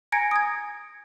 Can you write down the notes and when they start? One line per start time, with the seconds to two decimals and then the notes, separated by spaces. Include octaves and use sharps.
0.12 G#5 A#5 G#6 A#6 C#7 D7
0.31 D#6 G#6